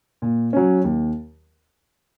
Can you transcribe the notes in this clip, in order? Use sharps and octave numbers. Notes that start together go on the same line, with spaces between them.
A#2
F#3 C#4
D#2